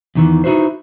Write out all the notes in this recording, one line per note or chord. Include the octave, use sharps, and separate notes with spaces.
E2 D#3 E3
D#4 E4 F#4 B4 C5